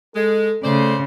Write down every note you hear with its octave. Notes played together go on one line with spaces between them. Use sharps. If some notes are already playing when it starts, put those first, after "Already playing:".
G#3 A4
C#3 A3 C5 D5